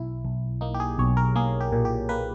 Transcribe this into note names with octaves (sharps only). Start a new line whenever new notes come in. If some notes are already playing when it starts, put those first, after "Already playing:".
Already playing: B1 E4
B1
A#3 D#4
G4
G#4
B1 C#5
A#4
A#3 G#4
G4
A#2
G4
A#3 B4